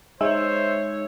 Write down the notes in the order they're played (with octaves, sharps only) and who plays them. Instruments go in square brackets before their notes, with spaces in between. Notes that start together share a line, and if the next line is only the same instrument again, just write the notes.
[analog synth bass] G#3 [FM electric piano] D#4 E5 E6 [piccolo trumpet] C5 [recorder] C#5